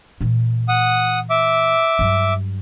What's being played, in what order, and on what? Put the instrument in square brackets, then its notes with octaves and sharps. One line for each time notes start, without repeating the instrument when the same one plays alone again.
[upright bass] A#2 E3
[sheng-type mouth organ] F#5 D#6
E5 D6
[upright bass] G2 F#3